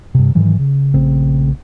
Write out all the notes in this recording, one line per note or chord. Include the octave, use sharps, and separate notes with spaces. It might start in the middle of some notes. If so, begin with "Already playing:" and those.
G2 C3
G#2 D#3 E3 F#3
C#3
A#1 C#3 A3 C4